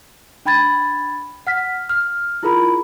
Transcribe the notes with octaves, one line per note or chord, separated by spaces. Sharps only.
D4 G5 B5 G#6 A6
F#5 F6 B6
F6
E4 F4 G#4 A#4 A#5 B5